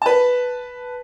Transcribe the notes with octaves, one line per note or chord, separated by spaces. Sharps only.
B4 A5